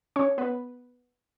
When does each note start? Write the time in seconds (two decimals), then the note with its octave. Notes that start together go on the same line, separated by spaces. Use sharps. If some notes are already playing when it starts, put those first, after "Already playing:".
0.16 C#4 C#5
0.38 B3 B4